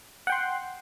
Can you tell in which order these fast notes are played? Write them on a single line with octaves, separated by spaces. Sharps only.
F#5 G5 C6